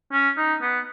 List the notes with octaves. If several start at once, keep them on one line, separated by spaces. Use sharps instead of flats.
C#4
D#4
B3